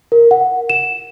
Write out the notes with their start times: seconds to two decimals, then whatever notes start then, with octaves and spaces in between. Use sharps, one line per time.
0.12 A#4
0.31 F#5
0.70 E7